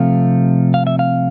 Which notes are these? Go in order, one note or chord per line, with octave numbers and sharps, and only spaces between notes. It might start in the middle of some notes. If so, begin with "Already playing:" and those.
Already playing: C3 F3 A3 C4 F5
F5
E5
F5